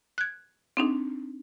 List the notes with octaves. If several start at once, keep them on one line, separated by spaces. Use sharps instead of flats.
F#6 G#6
C4 D4 D#4